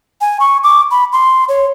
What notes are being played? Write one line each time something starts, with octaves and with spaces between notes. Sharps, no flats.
G#5
C#6
D6
B5
C6
C#5